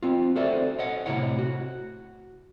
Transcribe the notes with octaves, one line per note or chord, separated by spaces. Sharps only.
C4 F4
F#4 A4 C5 D5 E5
C#5 D#5 F#5
A2 C3 E4 C#5 F#5
F#4